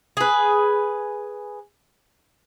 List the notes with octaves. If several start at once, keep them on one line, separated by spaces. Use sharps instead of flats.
G#4 B4